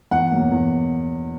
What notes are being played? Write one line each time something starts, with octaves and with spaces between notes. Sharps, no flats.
E2 F#5
B2 F#3 A#3
E2